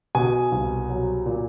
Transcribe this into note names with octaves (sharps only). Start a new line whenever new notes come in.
B2 G#5
C2
F#3
A#2